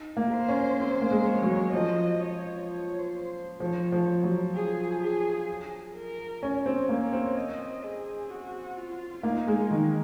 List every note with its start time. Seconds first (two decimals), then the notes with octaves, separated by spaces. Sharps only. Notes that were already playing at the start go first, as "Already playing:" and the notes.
Already playing: D#4
0.17 A#3
0.33 C5
0.48 C#4
0.79 C4 C5
1.02 A#3
1.11 G#3
1.26 C#5
1.42 F#3
1.73 F3 D#5
2.20 C#5
2.67 C#5
2.99 C5
3.60 F3 C#5
3.92 F3
4.23 F#3
4.55 G#4
5.02 G#4
5.96 A#4
6.43 C#4
6.66 C4
6.89 A#3 C#5
7.13 C4
7.35 D#5
7.84 G#4
8.30 F#4
8.77 F4
9.23 A#3 D#4
9.47 G#3
9.71 D#3 D#4